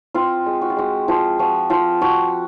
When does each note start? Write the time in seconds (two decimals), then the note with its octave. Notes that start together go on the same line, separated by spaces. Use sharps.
0.14 C4 F4
0.46 G#3
0.61 F#4
0.70 F4
0.76 G#3 F#4
1.08 F3 F4
1.39 F3 F#4
1.70 F3 F4
2.01 F3 F#4